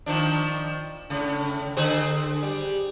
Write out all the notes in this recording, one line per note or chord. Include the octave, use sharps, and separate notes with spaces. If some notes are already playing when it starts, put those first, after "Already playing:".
D#3 F3 D4
A2 C#3
D3 G#4 C5
G3